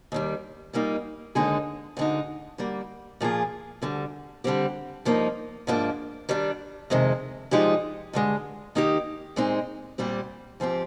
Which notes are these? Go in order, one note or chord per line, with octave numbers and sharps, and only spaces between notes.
D#2 D#3 G3
A#2 G3 A#3 D#4
D#2 D3 G#3 D#4 G#4
D2 D3 G#3 D#4
D3 G3 A#3
A#2 F3 A#3 F4 G#4
D2 D3 G3
D3 G3 C4 G4
G2 F3 A#3 D#4
G#2 F3 A#3 D4
D#3 G3 D4
F2 C3 D#3 G#3
A#2 F3 G#3 D#4 G4
G2 D3 G#3
D#3 A#3 D#4 G4
A#2 G#3 C4 D#4
A#2 G3 C4 G4
G#2 F3 C4 G4